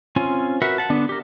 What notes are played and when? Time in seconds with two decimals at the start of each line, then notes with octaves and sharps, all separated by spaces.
0.16 C4 C#4 F4 G#5
0.62 F#4 A#4 B4 E5 F#5
0.78 F#5 A5
0.90 D3 B3 D4
1.09 G4 A#4